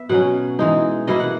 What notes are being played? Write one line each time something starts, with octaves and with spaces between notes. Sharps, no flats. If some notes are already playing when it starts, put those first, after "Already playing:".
Already playing: B3 E5
B2 F#3 C#4 F#5
E3 G#3 D#4
B2 A#3 E4 D#5
F#5